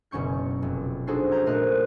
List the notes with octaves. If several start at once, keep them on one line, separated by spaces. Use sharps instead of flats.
F#1 B2 C#4 C#6 G6
F1
D4 D#4 F#4 G#4 A4 C5
A#5 G6 G#6
A#2 A3 A#4 C5 D#5 F#6